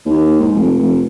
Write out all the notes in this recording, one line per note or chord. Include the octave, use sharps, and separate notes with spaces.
D#2
G#2
F1
F1